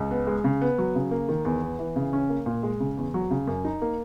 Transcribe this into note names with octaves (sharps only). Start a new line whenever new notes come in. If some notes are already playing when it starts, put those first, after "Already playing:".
Already playing: C#2
B3
G#3
C#3
B3
F#3
C#3
A#3
D#3
E2
B3
E3
C#3
C#4
A#3
A#2
G#3
C#3
E2
F#3
C#3
F#2
D#4
A#3